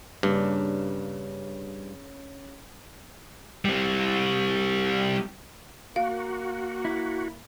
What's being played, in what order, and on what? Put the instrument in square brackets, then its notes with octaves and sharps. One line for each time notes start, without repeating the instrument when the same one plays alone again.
[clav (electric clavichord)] G2 [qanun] C#3 A#3 D4
[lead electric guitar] G3 C4
[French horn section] A#3 [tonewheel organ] F#4 [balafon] F5
[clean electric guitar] E4